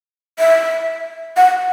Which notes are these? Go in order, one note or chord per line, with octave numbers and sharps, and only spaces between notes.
E5
F#5